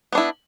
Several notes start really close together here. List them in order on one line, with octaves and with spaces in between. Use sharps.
B3 D4 E4